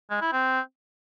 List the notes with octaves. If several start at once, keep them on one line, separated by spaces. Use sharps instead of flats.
G#3
E4
C4